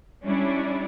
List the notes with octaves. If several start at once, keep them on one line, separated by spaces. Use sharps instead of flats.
G3 C#4 D4 E4